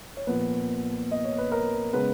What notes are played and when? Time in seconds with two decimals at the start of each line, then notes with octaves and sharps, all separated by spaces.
0.17 C#5
0.27 A#2 F3 B3 B4
1.11 D#5
1.25 C#5
1.38 B4
1.52 A#4
1.93 C#3 G#3 B3 B4